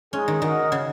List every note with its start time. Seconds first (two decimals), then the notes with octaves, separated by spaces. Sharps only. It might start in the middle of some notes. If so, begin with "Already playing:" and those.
0.12 G#3 C#4 D#4 G#4
0.28 D#3
0.42 D#3 F#4 A#4 D#5 F#5
0.72 C#3